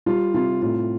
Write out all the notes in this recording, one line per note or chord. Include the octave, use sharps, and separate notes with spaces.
G3 F4
C3 F4
A2 F4